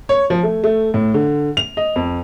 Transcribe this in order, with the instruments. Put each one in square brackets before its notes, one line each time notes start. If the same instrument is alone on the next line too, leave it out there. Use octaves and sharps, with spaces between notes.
[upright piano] C#5
F3
A3
A3
A2
D3
F7
D#5
F2